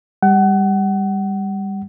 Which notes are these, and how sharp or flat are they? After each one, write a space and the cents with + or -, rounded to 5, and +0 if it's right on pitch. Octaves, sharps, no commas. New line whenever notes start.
G3 +20 F#5 +30